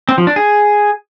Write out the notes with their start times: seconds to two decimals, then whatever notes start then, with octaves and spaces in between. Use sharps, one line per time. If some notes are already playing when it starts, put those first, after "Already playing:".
0.09 C4
0.18 F3
0.27 D4
0.36 G#4